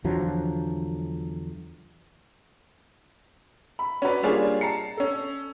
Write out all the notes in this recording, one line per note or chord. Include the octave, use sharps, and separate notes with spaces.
E2 D3 F3 F#3
B5
C#4 F#4 B4 D5
G3 A#3 D4 F4 G#4 C#5
A5 A#5 C7 C#7
C#4 A4